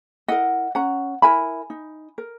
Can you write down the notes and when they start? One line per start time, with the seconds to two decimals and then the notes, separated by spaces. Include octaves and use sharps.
0.28 E4 A#4 D#5 F#5
0.75 C#4 F#5 A#5
1.22 E4 A#4 G#5 B5
1.70 D#4
2.18 A#4